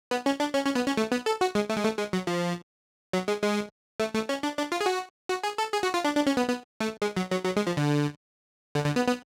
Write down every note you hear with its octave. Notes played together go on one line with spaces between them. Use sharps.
B3
C#4
D4
C#4
C#4
B3
C#4
A3
B3
A4
F#4
G#3
A3
G#3
A3
G#3
F#3
F3
F#3
G#3
G#3
A3
A3
C#4
D4
D4
F4
G#4
F#4
F#4
G#4
A4
G#4
F#4
F4
D4
D4
C#4
B3
B3
A3
G#3
F#3
F#3
F#3
G#3
F3
D3
D3
D3
B3
B3